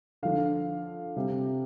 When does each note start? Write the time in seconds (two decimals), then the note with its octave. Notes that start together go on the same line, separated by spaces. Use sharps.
0.23 D3 F3 D4 F5
1.16 C3 G3 C4